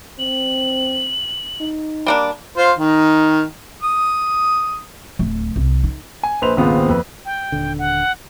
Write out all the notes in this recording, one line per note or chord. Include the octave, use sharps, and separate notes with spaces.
C4 F#7
D#4
G3 A#3 D4
F4 C5
D#3 D#4
D#6
D1 A3
C2
D#4
G#5
A#1 B4 C5 F7
D#1 G#1 C#3 B3 C4 F4
F2 B4
G5
D#1 D3
F#5